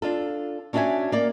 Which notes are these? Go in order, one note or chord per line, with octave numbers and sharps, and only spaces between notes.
D4 F4 A4
C#4 D4 F#4 A#4 E5 G#5
A#3 D5